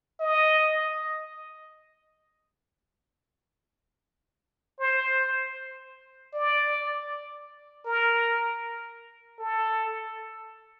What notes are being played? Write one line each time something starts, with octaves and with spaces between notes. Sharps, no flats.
D#5
C5
D5
A#4
A4